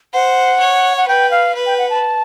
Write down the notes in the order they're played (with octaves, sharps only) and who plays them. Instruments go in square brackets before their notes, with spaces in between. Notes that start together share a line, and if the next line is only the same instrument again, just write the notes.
[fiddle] C5 [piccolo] F#5
[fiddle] C#5
[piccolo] F#5
[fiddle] B4 [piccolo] G5
[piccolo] F5
[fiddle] B4
[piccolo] G5
F#5
A5